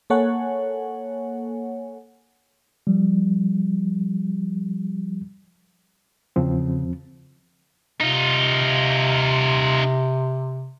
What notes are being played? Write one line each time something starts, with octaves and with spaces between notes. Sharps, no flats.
A#3 A4 C#5 F#5 G#5
F3 G3
E2 C#3 F3 C4
C3 D#4 F4